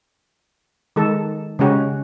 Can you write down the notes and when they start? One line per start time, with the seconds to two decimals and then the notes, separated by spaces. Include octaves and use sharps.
0.96 D#3 G#3 A4
1.59 C#3 G#3 C#4 F#4 G4